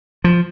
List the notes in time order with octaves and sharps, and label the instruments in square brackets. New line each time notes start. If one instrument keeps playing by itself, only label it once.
[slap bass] F3